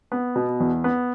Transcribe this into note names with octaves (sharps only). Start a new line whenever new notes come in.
B3
B2
E2
B3